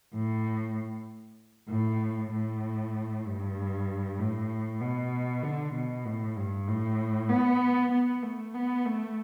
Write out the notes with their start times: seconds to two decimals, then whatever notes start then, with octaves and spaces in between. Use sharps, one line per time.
0.14 A2
1.70 A2
2.32 A2
3.25 G2
4.18 A2
4.81 B2
5.43 D3
5.74 B2
6.05 A2
6.36 G2
6.67 A2
7.29 B3
7.91 B3
8.23 A3
8.54 B3
8.85 A3